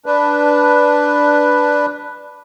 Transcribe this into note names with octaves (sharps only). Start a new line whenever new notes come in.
D4 B4